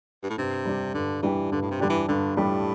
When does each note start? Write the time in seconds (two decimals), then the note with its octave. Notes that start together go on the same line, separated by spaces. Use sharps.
0.23 G2
0.30 A2
0.37 G2 C3
0.65 G3 D4 G4
0.94 G2 D3
1.23 E3 G3 D4 G4
1.52 G2 D3
1.62 A2
1.71 C3
1.80 D3 G3 D4 G4
1.90 E3
2.08 G2 D3
2.37 A2 G3 D4 G4